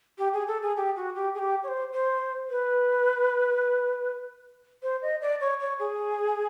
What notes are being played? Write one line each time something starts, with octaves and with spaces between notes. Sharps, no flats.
G4
G#4
A4
G#4
G4
F#4
G4
G#4
G4
C#5
C5
C5
B4
C5
D#5
D5
C#5
C#5
G#4